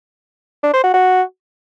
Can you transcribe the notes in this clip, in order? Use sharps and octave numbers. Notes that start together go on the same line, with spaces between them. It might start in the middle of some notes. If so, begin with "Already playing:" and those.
D4
C5
F#4
F#4